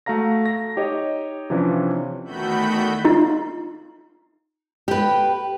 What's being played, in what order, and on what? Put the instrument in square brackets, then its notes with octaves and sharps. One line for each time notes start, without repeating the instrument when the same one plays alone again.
[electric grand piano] A3 F#4 F5 A#5 A#6
A#6
D#4 G4 C#5 D#5
C3 E3 F3 C#4 D4
[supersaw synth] E2 D#3 A3 F#4 B5 G6
[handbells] D#4 F4
[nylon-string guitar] G4 B4